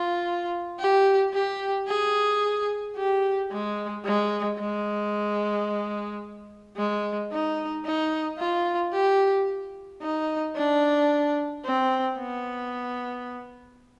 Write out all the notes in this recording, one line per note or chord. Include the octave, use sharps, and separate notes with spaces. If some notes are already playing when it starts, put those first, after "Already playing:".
Already playing: F4
G4
G4
G#4
G4
G#3
G#3
G#3
G#3
D#4
D#4
F4
G4
D#4
D4
C4
B3